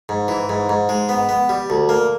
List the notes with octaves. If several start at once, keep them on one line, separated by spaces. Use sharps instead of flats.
G#2
E3
G#2
G#2
G#3
B3
B3
G3
D2
A#3